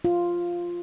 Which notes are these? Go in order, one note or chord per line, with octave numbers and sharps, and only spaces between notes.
F4